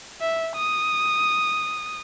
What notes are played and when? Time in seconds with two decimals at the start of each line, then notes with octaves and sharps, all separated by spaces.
0.21 E5
0.56 D#6